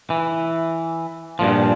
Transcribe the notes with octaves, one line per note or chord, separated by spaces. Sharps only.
E3
G2 A#2 F3